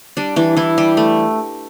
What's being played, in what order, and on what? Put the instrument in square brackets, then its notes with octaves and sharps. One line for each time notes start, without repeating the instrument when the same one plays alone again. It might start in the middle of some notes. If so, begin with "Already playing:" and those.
[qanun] G3 D4
E3 D4
E3 E4
G3 G4
A3